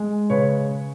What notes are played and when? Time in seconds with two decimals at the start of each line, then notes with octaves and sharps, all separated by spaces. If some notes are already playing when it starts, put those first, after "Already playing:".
Already playing: G#3
0.30 C#3 B4 C#5